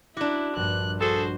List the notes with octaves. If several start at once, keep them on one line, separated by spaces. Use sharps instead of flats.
D4 E4 F#4 D6
A#1 G2 F#6
F#4 G#4 A4 C5